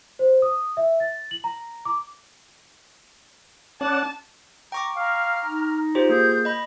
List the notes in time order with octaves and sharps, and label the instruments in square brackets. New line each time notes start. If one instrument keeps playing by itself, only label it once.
[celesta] C5
D#6
E5
A6
F#7
A#5
D6
[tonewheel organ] C#4 D5 F#5 [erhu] A5
[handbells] G5 C#6 D6 [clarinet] A#5
[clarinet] F5 [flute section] A#5 F6
[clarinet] D#4
[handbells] F4 G4 C5
[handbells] A#3 [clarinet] G#4 [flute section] G6
[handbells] D#5 B5